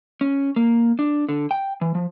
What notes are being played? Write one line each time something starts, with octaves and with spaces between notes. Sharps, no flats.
C#4
A#3
D4
D3
G5
E3
F3